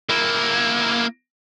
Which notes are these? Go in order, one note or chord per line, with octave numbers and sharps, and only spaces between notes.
A#3 E4